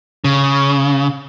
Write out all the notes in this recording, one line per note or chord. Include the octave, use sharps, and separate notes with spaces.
C#3